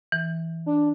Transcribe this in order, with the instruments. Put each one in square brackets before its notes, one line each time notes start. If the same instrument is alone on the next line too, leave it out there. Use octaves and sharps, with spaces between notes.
[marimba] E3
[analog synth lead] D4